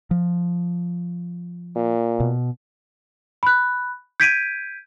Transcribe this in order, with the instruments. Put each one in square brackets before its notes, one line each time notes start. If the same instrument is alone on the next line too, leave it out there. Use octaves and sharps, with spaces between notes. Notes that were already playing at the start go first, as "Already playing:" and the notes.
[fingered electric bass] F3
[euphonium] A#2
[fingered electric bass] B2
[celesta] B5 F#6
G6 G#6 B6 D7 D#7